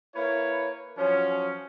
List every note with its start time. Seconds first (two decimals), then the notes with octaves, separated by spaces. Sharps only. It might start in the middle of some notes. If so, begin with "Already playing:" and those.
0.15 A#3 E4 B4 C#5
0.98 F3 F#3 C#4